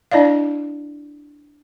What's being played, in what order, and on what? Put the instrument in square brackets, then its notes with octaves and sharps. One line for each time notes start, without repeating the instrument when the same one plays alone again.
[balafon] D4 E4 D5 D#5 F5